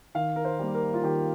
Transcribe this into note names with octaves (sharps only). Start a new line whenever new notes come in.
D#3 F5
A#4
C5
G3 A#3
A#4
F4
D#3 G4